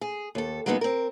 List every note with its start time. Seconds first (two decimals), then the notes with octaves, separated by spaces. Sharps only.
0.01 G#4
0.35 D#2 A4
0.66 F#3 G#3 A#3 B3 D4 D#4
0.81 C4 A#4